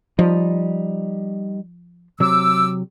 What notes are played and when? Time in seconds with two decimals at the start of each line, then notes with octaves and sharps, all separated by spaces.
0.19 F3 G3 D#4
2.20 C3 F#3 D6 E6